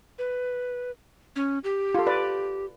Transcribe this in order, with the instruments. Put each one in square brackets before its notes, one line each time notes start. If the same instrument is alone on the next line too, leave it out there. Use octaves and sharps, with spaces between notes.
[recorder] B4
C#4
G4
[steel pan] F4 A4
B4 D5